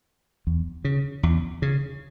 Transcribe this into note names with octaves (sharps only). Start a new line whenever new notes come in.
E2
C#3
E2
C#3